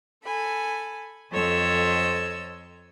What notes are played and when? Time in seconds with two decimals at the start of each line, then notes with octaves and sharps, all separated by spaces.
0.25 A4 G#5 B5
1.31 F2 A4 C5 C#5 D#5 E6